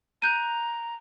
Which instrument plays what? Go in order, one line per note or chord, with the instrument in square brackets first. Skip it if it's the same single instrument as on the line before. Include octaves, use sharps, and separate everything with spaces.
[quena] A#5 [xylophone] F#6 G6 D#7